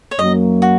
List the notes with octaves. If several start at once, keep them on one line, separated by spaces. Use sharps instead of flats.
C#5
F#2 F#3 A#3 D#5
F#4